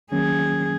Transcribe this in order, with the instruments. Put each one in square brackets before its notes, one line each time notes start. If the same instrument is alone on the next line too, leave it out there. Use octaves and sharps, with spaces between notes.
[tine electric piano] D#3 F#3 A#3 C#4 [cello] G#4